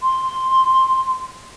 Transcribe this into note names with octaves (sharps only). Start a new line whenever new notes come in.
C6